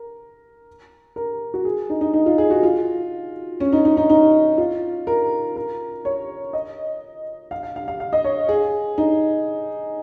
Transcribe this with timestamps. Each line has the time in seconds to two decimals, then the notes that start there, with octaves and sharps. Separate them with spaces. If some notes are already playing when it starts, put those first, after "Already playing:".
Already playing: A#4
1.16 A#4
1.54 F#4
1.65 G#4
1.90 D#4
2.01 D#4
2.14 D#4
2.26 F4
2.38 G#4
2.50 F#4
2.63 F4
3.60 C#4
3.72 D#4
3.85 D#4
3.97 D#4
4.10 D#4
4.58 F4
5.07 A#4
5.56 A#4
6.05 C#5
6.53 D#5
7.51 F5
7.63 F5
7.76 F5
7.88 F5
8.00 F5
8.13 D#5
8.24 C#5
8.49 G#4
8.98 D#4